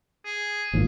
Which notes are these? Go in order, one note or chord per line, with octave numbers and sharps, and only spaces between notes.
G#4
G#1 A#2